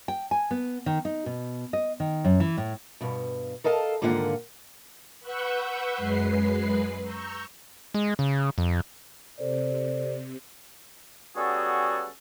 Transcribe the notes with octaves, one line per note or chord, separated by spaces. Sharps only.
G5
G#5
B3
D#3
D#4
B2
D#5
D#3
F#2
E3
A2
G2 B2
A4 A#4 D#5 F5 G#5 A5
G#2 D3 D#3 A#3 F4 F#5
B4 F#5 C#6 E6 F#6 G6
F#2 G#3 B4 C7
A#5 C#6 E6 G6
G#3
C#3
F2
C3 A4 C5 D5
G3 B3 C#4 F#4 G#4 A4